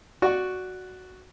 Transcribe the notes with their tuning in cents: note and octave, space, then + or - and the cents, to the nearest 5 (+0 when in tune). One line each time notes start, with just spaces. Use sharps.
F#4 +0 D5 +0 C#6 +0